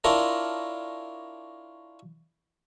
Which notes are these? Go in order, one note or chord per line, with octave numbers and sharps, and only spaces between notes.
D4 E4 F4 A#4 C#5 D5